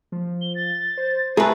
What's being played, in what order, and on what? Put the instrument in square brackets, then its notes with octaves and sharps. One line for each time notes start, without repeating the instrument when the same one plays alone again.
[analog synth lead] F3
[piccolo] G7
A6
[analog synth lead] C5
[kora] A3 [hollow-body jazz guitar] G#4 B4 [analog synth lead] A#5